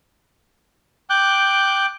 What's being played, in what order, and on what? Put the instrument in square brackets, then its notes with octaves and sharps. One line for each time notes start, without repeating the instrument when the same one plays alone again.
[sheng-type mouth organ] G5 D6 F#6 G6